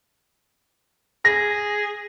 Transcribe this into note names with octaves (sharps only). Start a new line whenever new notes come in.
G#4 A#6